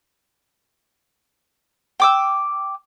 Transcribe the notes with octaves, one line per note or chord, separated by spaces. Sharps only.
G5 D6 E6